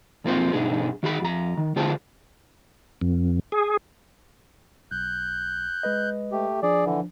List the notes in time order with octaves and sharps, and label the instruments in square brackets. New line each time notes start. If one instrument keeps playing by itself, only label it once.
[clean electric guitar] B1 F2 A#3 C4 F4 C5
G2 B2 D4 D#4 G#4
D#3 F#4 G#4 B5
F2 A#5
D#3
D3 F4 G#4 C5 A5
[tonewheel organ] F2
G#4
[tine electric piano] B1 [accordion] F#6 G6
[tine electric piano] G#3 B4 D#5
[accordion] A3 G4
[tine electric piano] F3 D4 [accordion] G#4 D5
[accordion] D3 E3